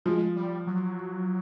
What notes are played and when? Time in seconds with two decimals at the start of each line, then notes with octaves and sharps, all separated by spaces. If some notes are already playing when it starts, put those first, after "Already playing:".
0.05 F3 G#3
0.36 G3
0.67 F#3